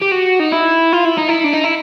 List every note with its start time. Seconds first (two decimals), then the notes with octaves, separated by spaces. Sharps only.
0.02 G4
0.12 F#4
0.40 D#4
0.52 E4
0.92 F4
1.05 E4
1.17 D#4
1.28 E4
1.44 D4
1.54 D#4
1.64 E4